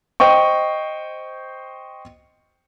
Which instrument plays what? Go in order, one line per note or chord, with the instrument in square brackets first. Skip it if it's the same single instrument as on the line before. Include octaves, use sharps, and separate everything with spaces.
[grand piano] C5 D#5 G5 C#6